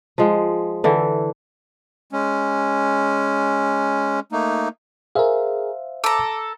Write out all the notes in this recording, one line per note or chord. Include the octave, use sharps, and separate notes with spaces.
F3 G#3
D3 E3 E5
G#3 C#4
A3 A#3 D#4
G#4 A#4 C5 E5 F5
A4 A#5 D6